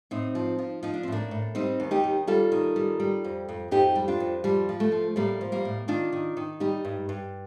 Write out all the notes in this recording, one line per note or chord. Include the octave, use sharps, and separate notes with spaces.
A2 C4 D#4
F3
F3
F3 D#4
D4
C4
A2 A#3 D4
A2
G3 C4 D#4
D#2
D#4 G4
D#2
G3 F4 A4
D#3
G3
G3
F2
F2
F2 D#4 G4
G3
D4 F4
F2
F3 G3
F3
A3
F3
A2 G3 A#3
F3
G3 A#3
A2
D#3 D4 F4
D#3
D#3
G3 D#4 G4
G2
G2